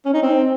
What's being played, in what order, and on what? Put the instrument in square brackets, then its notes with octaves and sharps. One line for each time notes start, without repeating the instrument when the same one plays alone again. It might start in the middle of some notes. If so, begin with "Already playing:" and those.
[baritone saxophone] C#4
D#4
C4